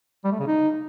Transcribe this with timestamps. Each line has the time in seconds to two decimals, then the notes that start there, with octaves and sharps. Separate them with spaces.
0.24 G3
0.32 A3
0.39 C#3
0.47 D#4